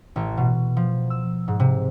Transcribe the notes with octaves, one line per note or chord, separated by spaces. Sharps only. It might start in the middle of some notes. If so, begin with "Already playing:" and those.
A1
B2
F3
E6
G#2
C3